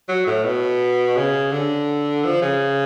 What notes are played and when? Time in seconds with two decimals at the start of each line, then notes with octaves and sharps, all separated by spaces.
0.08 F#3
0.26 A2
0.44 B2
1.17 C#3
1.52 D3
2.24 F3
2.42 C#3